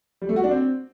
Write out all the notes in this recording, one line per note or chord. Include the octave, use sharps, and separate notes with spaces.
G3
A3
F#4
D4
C4